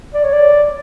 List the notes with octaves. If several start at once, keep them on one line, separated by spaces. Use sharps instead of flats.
D5
C#5
D5